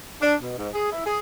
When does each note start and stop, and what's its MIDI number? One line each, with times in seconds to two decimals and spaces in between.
0.22 0.35 62
0.43 0.58 47
0.58 0.69 44
0.74 0.91 68
0.93 1.03 64
1.06 1.19 68